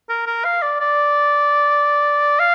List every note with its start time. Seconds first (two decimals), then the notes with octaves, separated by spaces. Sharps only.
0.09 A#4
0.27 A#4
0.44 F5
0.62 D5
0.80 D5
2.39 F5